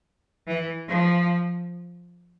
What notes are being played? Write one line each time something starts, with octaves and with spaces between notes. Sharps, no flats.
E3
F3